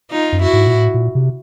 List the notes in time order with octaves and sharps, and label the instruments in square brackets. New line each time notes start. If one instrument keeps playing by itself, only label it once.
[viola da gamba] D#4 F4
[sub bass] F#2
[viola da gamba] E4 F#4
[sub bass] G#2
A#2
A2
A#2
C3